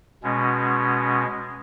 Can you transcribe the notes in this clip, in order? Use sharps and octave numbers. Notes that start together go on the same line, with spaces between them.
B2 G#3 C#4